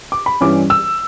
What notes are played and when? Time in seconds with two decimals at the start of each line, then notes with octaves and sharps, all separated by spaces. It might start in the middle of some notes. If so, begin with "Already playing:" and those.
0.12 D6
0.26 B5
0.41 G2 E3 G3 C#4 E4 D6
0.70 E6